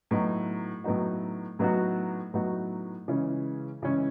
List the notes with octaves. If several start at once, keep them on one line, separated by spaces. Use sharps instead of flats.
A2 F#3 B3 D#4 F#4
A2 F#3 B3 D#4 F#4
A2 F#3 B3 D#4 F#4
A2 F#3 B3 D#4 F#4
C#3 E3 G#3 C#4
C#3 E3 G#3 C#4